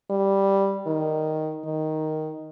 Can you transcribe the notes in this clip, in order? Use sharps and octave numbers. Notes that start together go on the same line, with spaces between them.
G3
D#3
D#3